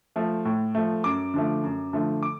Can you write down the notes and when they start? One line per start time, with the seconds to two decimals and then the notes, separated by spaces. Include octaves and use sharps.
0.16 F3 A3
0.45 A2
0.75 F3 A3
1.04 F#2 D6
1.34 D3 F3 A3
1.64 F#2
1.93 D3 F3 A3
2.23 D6